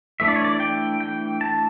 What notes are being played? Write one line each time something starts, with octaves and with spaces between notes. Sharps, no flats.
E3 A3 D4 E5
D5
C#5
D5
G5
G5
A5